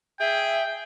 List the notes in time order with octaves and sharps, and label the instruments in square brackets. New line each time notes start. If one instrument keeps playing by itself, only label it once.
[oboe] G#4 [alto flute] E5 [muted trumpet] G5